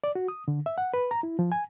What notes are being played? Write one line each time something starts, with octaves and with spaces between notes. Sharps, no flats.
D5
F#4
D#6
D3
E5
F#5
B4
A#5
E4
F3
G#5